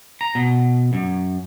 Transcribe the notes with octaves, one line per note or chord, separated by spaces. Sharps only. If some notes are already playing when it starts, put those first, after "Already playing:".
A#5
B2
F#2